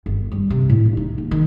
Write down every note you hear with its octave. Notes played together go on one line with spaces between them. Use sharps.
G1
G3
C3
A2
G2
D#4
D#2
D#3